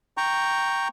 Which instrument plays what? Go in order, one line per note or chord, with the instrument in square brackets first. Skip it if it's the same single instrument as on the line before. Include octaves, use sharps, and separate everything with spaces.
[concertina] G5 A#5 C#6